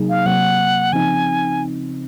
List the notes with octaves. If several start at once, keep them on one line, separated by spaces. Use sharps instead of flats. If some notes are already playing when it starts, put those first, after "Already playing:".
Already playing: C3 F#3 A#3 D#4 G#4
F5
C3 F#3 A#3 F#5
C#3 F3 C4 D#4 G#5